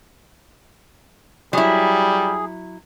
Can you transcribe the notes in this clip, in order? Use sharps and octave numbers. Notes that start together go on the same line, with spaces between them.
F#3 G3 E4 G#4